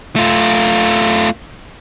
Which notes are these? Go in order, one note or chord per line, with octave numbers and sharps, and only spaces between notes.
A3 F4